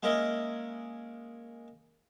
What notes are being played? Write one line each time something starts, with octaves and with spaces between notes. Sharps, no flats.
G#3 A#3 C#4 A#4 D#5 E5